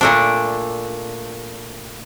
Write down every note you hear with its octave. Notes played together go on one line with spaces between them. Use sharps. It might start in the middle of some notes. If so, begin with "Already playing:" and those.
A#2 A3 D4